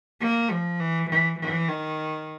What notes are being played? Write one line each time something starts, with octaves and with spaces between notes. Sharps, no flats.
A#3
F3
E3
E3
E3
D#3